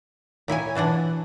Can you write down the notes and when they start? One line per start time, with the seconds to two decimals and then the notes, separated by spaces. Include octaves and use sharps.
0.48 A#2 E4 C#5 G#5
0.75 B2 E3 D4 F#5